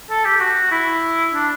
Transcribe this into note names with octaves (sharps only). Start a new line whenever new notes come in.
A4
G4
F#4
E4
D4